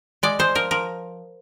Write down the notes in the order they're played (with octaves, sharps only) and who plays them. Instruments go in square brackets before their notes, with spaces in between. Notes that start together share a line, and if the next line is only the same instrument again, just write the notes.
[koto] G#3 D5
G#3 C5
F3 A#4
F3 A#4